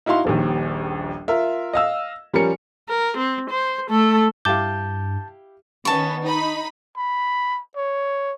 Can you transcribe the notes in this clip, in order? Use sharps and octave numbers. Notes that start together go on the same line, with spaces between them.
D#4 E4 F#4 F5 C6
D#1 A#1 D#2
F4 A#4 E5
D#5 F5 E6
F3 G3 C#4 A#4 C#7
A#4
C4
C5
A3 A4
G2 E4 G4 F5 A5 D6 G6
D#3 B3 C#4 A5 C#6
D#4 B5
B5
C#5